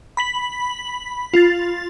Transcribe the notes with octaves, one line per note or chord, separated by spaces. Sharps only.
B5 B6 F#7
F4 A6